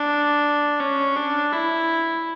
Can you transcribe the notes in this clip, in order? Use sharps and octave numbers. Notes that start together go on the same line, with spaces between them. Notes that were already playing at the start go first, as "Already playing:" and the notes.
Already playing: D4
C#4
D4
E4